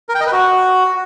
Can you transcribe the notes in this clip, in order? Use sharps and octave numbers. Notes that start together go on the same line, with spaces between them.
A#4
G5
D#5
B4
F#4